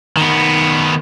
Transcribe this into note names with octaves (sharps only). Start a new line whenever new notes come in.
D#3 B3